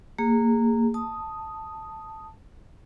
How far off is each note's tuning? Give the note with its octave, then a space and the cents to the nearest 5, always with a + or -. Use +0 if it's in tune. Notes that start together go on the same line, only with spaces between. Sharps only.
A#3 -15 G#4 -20
A5 +0 D#6 +0